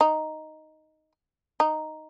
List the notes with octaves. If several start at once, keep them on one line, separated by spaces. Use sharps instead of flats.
D#4
D#4